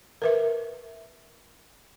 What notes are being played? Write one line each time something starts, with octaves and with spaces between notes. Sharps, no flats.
A#4 B4 E5